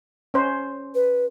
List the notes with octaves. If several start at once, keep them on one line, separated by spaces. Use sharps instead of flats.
C#4 C5
B4